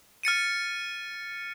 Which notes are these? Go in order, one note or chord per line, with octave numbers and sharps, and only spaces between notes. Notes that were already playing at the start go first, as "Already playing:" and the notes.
F6 A6 C#7 D#7